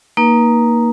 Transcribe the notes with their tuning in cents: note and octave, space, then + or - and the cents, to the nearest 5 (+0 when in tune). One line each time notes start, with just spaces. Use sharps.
A#3 +0 D#4 +0 B4 -45